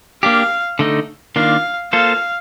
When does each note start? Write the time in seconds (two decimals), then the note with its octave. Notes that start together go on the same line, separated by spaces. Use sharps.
0.23 A#3 D4 G4 F5
0.79 D3 A3 D#4
1.36 D#3 A#3 D4 F4 F5
1.93 A#3 F4 A4 C5 F5